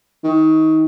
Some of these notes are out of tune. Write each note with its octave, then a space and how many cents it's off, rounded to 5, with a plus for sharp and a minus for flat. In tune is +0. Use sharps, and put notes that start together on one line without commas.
D#3 +25